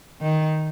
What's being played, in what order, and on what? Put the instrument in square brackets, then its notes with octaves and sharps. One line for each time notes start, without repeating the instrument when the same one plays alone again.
[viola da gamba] D#3